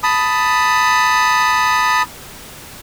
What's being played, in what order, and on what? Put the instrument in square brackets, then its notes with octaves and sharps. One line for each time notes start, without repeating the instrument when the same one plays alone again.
[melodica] A5 B5 D#6